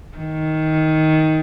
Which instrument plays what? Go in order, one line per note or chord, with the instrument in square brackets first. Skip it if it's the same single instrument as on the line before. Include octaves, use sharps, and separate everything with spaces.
[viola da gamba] D#3